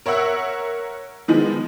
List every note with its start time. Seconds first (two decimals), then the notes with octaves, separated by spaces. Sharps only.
0.06 A#4 C#5 E5 F#5 E6
1.28 D#3 F3 G#3 B3